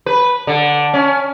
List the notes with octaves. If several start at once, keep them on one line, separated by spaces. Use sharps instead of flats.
B4
D3
C#4